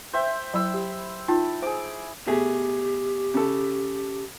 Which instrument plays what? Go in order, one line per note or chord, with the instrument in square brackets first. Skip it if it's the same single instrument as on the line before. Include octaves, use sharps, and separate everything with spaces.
[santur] C5 E5 G5
[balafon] F#3 [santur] E4 E6
[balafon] G4
[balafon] D#4 F4 G5 [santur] A5
[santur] G#4 D6 [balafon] C5
[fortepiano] B2 A3 G#4 [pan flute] G4
[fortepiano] C#3 A4